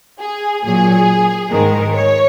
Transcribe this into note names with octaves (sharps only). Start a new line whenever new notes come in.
G#4
A#2 F#3 G#4
G#2 D#3 G#3 A#4
C#5